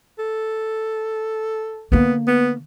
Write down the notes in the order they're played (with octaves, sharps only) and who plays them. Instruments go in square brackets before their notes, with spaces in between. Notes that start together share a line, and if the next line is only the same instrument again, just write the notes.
[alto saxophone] A4
[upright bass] D3 A#3 [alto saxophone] B3
[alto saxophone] B3